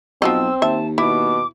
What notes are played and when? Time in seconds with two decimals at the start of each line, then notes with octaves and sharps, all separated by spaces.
0.22 B1 F3 F#3 C4 D#5 E6
0.62 D#2 E5 A5
0.98 B2 E4 D6